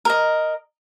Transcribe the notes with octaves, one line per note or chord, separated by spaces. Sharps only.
A#4 D#5